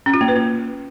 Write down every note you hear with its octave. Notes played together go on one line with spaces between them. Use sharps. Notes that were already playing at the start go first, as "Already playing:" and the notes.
C#4
F4
A#3
B4
A#3